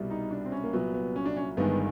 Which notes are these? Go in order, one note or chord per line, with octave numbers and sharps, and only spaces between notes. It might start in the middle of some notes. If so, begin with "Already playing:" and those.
Already playing: C2 B2 G3
D#4
D4
C4
C#4
A#3
C2 A#2 F#3 B3
B3
C#4
D4
C#4
G1 G2 D#3 G#3 B3